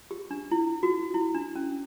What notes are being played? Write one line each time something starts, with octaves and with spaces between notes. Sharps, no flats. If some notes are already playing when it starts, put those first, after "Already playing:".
G4
D4
E4
F#4
E4
D4
C#4